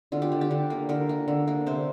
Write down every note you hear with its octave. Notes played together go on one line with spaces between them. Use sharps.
D3 F4
G4
D3
G4
D3
A#3
D3 A#4
A#3
D3
A#3
C3 C5